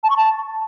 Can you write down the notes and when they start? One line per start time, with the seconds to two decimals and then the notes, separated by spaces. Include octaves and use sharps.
0.04 A5
0.10 C#6
0.17 A5